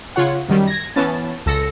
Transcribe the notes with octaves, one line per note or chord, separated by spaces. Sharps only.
C#3 F4 C#5 F#5
F#2 D#3 G3
G#6 A#6
E3 B3 C#4 A5
C#2 A4 E6 A#6 C#7